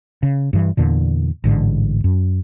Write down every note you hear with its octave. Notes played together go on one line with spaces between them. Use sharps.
C#3
G2 E3
E2 A#2 D3
A1 G#2 D3
F#2